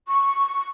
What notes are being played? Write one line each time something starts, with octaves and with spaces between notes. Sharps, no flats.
C#6